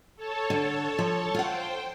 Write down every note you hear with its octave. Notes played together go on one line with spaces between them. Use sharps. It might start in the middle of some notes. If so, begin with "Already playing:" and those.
A4 C#5 A5
D3
F3
F4 C5 F#5 G5